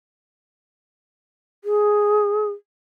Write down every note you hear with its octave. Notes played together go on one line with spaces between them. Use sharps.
G#4